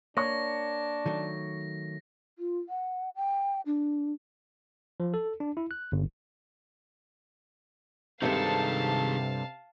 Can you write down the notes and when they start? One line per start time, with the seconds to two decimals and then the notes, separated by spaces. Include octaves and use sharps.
0.17 A#3 D4 C#5 C#6 A#6
1.06 D#3 F#3 A3
2.39 F4
2.69 F#5
3.16 G5
3.66 D4
5.00 F3
5.14 A4
5.40 D4
5.57 E4
5.71 F#6
5.92 G1
8.22 G2 C3 D#3 G3 G#3 A4 F5 A5